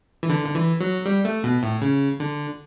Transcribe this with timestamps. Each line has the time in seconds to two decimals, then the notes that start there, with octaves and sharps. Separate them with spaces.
0.23 E3
0.29 D3
0.46 D3
0.55 E3
0.81 F#3
1.06 G3
1.25 A3
1.44 B2
1.63 A2
1.82 C#3
2.20 D3